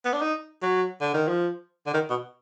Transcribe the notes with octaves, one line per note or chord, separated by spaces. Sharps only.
B3
D4
D#4
F#3
D3
D#3
F3
D3
D#3
B2